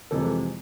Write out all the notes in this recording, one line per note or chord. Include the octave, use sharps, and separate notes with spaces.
F2 C3 E3 G#3 A4